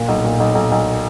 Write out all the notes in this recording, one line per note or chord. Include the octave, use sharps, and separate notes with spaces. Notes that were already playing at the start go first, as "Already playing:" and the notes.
Already playing: A#2
B1
A#2
B1
B1
B1